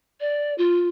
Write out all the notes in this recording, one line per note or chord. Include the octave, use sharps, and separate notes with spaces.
D5
F4